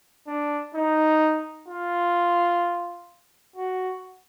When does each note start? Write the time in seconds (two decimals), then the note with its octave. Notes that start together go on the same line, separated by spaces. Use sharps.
0.27 D4
0.75 D#4
1.68 F4
3.56 F#4